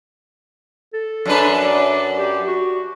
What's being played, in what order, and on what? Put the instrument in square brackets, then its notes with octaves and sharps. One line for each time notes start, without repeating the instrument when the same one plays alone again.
[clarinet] A4
[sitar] F#2 D4 B4
[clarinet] D5
G4
F#4